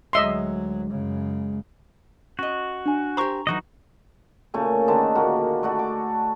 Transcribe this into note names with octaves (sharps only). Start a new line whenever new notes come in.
D2 F#3 G#3 D#5 E5 C6
F#2 C#3
C#4 F#4 D#5
D4 G#5
G4 A#4 C5 A#5 C#6
D3 E3 F#3 D#4 F#4 D#5
A#2 C#3 A3 G#5
D3 D#3 D4 A5
A#2 A#3 F#4
A3 D4 F#4
D6